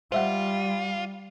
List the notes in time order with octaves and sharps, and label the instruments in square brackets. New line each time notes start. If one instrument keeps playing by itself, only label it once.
[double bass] G3 [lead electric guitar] F4 [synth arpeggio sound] C5 E5 F#5